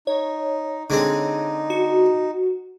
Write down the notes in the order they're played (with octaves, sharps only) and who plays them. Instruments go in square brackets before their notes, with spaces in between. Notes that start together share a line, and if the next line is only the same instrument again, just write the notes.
[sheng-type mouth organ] D#4 [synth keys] C#5
[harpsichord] D3 G#3 C4 [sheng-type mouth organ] D#4
[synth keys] F#4